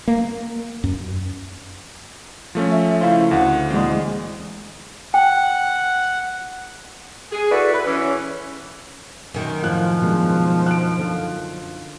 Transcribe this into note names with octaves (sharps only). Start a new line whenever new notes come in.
A#3
F#2
F3 A3 C#4
E5
C#3 E4 C5 F5
D2 F#5
A#2 E3 G#3 C4
F#5 G5
G#4
E4 F#4 A4 B4 D5
B4
E3 C#4
F#2 D#3
A2 F3 F4 F#6
B2 G#3 D4
F#6 D7
D3 F4